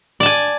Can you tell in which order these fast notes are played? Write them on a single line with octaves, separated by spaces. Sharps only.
D5 A5 G#5